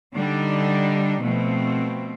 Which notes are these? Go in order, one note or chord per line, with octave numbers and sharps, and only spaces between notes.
D3 G3 D4 D#4
B2 F3 A3 C4